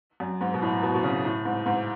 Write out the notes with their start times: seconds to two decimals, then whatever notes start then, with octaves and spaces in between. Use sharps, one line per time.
0.20 F#2
0.41 G#2
0.54 B2
0.62 A2
0.83 B2
0.94 B2
1.03 C#3
1.25 A2
1.45 G#2
1.66 G#2